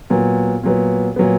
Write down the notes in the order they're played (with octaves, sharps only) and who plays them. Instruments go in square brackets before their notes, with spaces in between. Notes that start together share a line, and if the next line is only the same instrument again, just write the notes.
[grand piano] A#2 F#3 B3
A#2 F#3 B3
A#2 F#3 B3